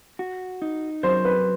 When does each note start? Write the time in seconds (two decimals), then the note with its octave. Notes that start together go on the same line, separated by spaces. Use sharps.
0.19 F#4
0.62 D#4
1.03 F#3 C5
1.25 B4